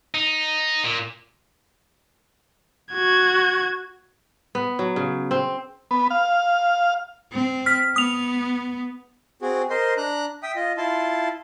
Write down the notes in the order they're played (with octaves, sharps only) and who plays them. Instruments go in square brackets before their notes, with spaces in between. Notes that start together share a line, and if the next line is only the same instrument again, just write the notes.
[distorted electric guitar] D#4
A#2
[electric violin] F#4 G#6
[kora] B3
F#3
C#3
C4
[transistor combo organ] B3
F5
[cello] C4
[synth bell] F6 B6
[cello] B3 [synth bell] D#6 F7
[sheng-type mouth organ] C4 F#4 G#4
A#4 C5 D#5 C6
D4 A#5 F#6
E5 G5 D#6
F4 D#5
E4 F4 A5 C6